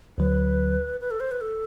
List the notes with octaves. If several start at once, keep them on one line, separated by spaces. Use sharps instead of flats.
D2 D3 F#3 B4
B4
A4
C5
B4
A4